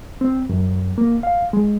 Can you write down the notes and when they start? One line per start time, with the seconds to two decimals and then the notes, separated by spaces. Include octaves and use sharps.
0.21 C4
0.49 F#2
0.98 A#3
1.23 F5
1.53 G#3